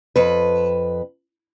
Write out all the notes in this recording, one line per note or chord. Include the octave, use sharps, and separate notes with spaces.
F2 B4